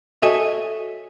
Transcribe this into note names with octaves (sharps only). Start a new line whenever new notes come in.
F#4 A4 C#5 D#5 E5 G#5